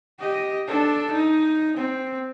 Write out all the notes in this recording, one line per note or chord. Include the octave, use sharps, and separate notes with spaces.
G4 D#5
D4 A4
D#4
C4